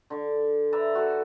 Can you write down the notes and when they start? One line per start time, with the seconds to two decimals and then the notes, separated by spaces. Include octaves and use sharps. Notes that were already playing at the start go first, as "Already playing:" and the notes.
0.10 D3 D5
0.72 B4 D5 E5 A#5
0.95 F#4 A4